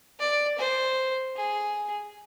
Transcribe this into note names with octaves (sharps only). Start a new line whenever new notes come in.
D5
C5
G#4